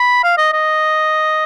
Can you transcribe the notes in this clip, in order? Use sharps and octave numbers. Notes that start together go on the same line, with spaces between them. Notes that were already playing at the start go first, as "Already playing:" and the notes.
Already playing: B5
F5
D#5
D#5